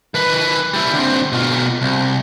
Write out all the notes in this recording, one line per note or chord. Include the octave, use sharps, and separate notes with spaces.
D#3 B4
G3 E4
D3 C4
B2 F4
C2